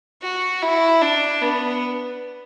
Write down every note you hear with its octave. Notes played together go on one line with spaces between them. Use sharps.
F#4
E4
D4
B3